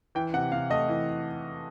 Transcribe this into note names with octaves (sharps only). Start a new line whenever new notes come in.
E3 G5
C3 F#5
C3 F5
A3 D#5
E3